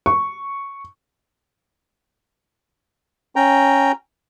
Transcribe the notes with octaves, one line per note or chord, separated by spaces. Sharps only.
C#6
C#4 G5 A#5